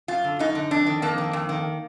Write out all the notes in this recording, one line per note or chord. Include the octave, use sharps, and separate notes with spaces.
F#2 F4
D3
F#2 D#4
D3
F2 D4
D#3
F2 A#3
D#3
F2
D#3